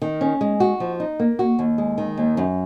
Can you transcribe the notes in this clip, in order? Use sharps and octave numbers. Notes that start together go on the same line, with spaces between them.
D#3
C#4
G#3
F#4
F3
D#4
A#3
F#4
D#2
G#3
D#3
D#2
F#2